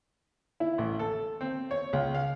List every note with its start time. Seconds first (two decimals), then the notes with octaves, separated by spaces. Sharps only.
0.60 E4
0.78 A1
0.99 A4
1.41 C4
1.71 C#5
1.93 C#2
2.15 F5